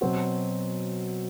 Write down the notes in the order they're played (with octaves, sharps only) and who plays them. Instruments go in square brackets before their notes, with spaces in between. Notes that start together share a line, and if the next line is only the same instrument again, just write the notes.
[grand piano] B2 F#3 C4 F#4